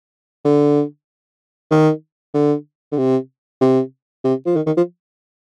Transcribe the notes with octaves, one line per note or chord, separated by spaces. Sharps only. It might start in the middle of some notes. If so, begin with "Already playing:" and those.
D3
D#3
D3
D3
C3
C3
C3
F3
D#3
D#3
F3